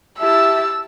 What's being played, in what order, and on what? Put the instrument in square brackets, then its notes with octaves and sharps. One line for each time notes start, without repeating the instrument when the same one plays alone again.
[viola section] E4 G4 A5 [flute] E5 [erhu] E6